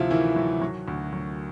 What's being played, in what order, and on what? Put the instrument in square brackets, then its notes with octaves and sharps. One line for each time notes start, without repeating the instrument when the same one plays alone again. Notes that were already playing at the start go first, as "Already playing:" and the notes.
Already playing: [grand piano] D2 C3 F3 E4 F4
D#3 E3 E4
F#3
F#3
D2
F#3